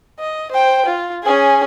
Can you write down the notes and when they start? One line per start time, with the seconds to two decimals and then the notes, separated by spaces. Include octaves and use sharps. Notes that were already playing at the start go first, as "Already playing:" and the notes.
0.19 D#5
0.52 C5 G5
0.86 F4
1.23 C#4 G#4